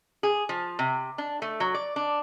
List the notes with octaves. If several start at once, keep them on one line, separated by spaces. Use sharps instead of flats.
G#4
F3
C3
D4
A3
F#3
D5
D4